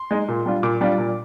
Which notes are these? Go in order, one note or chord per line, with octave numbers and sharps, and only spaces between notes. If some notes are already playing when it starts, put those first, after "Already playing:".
Already playing: C6
G#3 D#4
A#2
G3 D4 F4
A#2 D6
G3 D4 F4
A#2